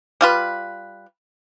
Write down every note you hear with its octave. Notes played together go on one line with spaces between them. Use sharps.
G3 F4 B4